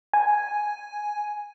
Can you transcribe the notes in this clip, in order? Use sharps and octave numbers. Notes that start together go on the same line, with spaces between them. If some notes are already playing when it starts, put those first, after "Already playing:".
G#5